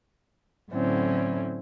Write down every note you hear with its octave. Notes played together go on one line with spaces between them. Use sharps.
A2 D3 F#3 C4 C#4 E4